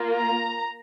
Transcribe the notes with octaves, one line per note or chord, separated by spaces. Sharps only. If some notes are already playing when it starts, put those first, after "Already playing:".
Already playing: A#3 F4
A#5